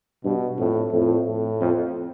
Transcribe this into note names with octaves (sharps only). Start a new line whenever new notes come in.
G2 B2
F2 A2
F2 A2
A2
F2